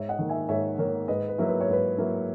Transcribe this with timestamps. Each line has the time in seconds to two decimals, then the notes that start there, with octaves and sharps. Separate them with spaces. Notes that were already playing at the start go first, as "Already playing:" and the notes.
Already playing: G#2 C#5 E5
0.09 D#5 F#5
0.19 D#3 A#3
0.29 E5 G#5
0.48 G#2 C#5 E5
0.78 D#3 A#3 A#4 C#5
1.08 G#2 B4 D#5
1.29 B4
1.38 F#3 A#3 E4
1.48 B4
1.61 C#5
1.68 G#2 B4
1.98 F#3 A#3 E4